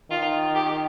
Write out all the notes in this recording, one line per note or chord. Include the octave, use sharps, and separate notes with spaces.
D#3 F4
G4